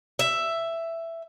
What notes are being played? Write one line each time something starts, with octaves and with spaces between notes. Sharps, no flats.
E5